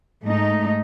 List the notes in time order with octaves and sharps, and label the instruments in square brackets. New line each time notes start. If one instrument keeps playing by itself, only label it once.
[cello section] G#2 A3 D#4